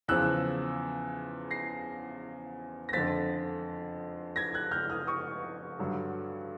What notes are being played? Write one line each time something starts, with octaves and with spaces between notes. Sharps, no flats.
E2 C#3 F3 E6 F#6
A#6 C7
A#6
F2 D3 F3 A6 B6
G#6 A#6
F#6 G#6
F6 G6
D#6 F6
C#6 D#6
G2 D3 F#3